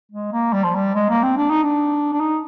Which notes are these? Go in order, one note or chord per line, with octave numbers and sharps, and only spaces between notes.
G#3
A#3
G3
F3
G3
G#3
A#3
C4
D4
D#4
D4
D4
D#4